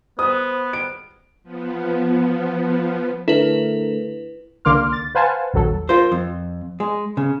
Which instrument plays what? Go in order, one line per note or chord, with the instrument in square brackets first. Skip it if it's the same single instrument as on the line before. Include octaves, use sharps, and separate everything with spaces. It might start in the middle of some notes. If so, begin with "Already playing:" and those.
[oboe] B3 [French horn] C5 [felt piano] D#6
[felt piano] D7
[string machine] F3 B3
[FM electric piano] D3 A3 A#4 [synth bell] E4 B4
[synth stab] C#2 D3 A#3 C6 D6 F6
A6
B4 C5 F5 F#5 G#5 A5
A#1 D#2 F#3 A4
[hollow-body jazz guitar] F4 A#4 C5
F2
G#3
C#3